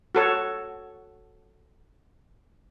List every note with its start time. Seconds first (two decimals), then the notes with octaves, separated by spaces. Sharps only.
0.15 F#4 A4 C#5